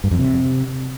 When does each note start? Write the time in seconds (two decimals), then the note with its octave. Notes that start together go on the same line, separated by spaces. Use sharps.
0.04 G2
0.11 F2
0.19 C3